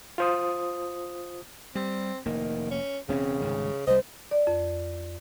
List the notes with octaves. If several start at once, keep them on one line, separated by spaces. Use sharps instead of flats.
F4 C5 D#6
G3 C4
F1 D#3 A#3
C#4
E1 C#3 C4 C#4
C2 G#2 D#3
C2 G3 C5 D#5
D5
F2